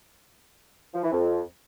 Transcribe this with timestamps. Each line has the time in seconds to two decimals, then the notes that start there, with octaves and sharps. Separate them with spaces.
0.94 F3
1.03 E3
1.12 F2